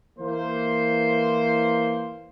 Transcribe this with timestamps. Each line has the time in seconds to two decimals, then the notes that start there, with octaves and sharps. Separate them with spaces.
0.19 E3 A#3 C5